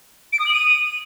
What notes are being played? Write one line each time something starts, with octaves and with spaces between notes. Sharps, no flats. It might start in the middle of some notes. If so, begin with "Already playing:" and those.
D7
D#6
F#7
D#7